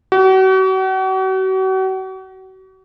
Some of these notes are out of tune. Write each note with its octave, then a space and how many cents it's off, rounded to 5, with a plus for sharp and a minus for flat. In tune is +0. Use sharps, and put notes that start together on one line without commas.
F#4 +40